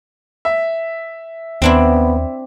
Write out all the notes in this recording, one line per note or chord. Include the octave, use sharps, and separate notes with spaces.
E5
D#2 B3 C4 D4 E4